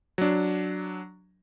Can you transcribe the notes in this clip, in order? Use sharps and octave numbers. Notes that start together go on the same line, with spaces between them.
F#3 D4